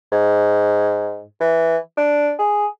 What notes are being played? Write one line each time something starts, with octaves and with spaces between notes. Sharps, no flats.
G#2
E3
D4
G#4